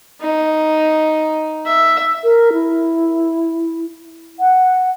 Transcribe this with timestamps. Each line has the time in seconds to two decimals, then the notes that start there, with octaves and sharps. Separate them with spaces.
0.21 D#4
1.66 E5
2.24 A#4
2.53 E4
4.40 F#5